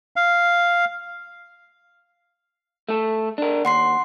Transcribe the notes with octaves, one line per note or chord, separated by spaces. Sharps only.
F5
A3 A4
D4 A#4
D#2 F#5 C6 C7